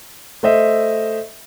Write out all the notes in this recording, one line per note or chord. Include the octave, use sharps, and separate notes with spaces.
A3 C5 D#5 E5